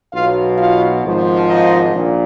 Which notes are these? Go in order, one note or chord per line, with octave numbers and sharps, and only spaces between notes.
B1 B2 F#3 F4 F5
F4 F5
G#1 G#2 F3
D#4 D#5
A#1 A#2